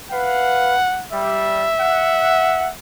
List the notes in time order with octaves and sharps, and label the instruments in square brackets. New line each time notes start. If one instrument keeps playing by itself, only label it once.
[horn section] B4 F5 [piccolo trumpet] F#5
[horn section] G3 [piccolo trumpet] E5
[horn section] F#5